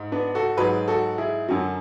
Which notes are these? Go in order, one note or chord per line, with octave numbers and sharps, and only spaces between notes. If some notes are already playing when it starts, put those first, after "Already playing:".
Already playing: G#2
B3 D4
F#4 A4
G#2 F#3 G#4 B4
F#4 A4
E4 G#4
F#2 D3 F#3